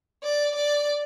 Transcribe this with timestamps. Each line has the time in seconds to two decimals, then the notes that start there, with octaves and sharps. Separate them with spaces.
0.23 D5
0.55 D5